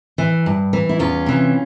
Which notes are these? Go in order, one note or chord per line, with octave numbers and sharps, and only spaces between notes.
E3
G2
E3
E4
E2 C#4 F4
C3 E3